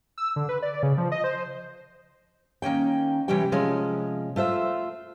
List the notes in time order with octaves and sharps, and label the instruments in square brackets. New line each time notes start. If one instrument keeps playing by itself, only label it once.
[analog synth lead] E6
D3
B4
D5
C#3
F3
D#5
C5
[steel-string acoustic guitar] D#3 A#3 C#4 G5
C3 E3 G3 C#4 G4 G5
C3 F3 G#3 C#4
A3 F4 C5 E5